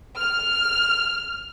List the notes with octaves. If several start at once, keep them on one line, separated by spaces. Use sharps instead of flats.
F6